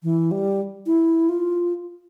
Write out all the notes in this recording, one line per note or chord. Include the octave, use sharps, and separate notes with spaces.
E3
G3
E4
F4